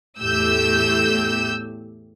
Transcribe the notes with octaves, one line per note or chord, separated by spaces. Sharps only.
E2 A2 A3 G4 E6 G6